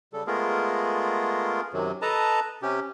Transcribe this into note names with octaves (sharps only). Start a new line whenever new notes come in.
C#3 G3 A4
G#3 A3 B3 F4 G#4 A#4
F#2 C3 D#3 F#3
A4 B4 D#5 A5 A#5
C3 C#4 G4